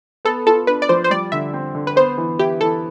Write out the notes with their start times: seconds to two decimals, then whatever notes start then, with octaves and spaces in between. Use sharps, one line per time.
0.25 B3 A4
0.47 F4 A4
0.67 D4 B4
0.82 D5
0.89 F3 C5
1.04 C5
1.10 G3 D5
1.32 D3 E5
1.54 C4
1.75 D3
1.87 B4
1.96 B3 C5
2.18 E3
2.39 E4 G4
2.61 E3 A4